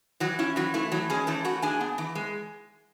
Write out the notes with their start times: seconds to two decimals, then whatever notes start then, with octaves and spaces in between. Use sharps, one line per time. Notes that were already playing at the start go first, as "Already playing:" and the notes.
0.20 E3 F#3 F#4
0.39 C#4 E4
0.56 E3 F#3 F#4
0.74 A3 E4
0.92 E3 F#3 F#4
1.10 G#3 C#4 G#4
1.27 E3 A3 A4
1.45 A3 F#4 F#5
1.62 D4 G#4 G#5
1.81 B3
1.98 E3
2.15 G#3